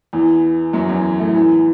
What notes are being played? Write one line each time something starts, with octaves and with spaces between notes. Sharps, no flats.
E2 E3
F#2 F#3
E2 E3
A2 A3
E2 E3